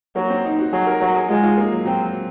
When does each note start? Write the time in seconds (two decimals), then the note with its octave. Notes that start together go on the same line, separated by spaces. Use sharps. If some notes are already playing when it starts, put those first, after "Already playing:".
0.16 F#3 A#3
0.30 C4
0.45 D#4
0.59 F#4
0.73 F#3 G#4
0.87 A#4
1.01 F#3 A#4
1.15 G#4
1.29 G#3 F4
1.43 F4
1.58 A#3
1.71 F#3
1.85 F#3 C4
2.05 F#3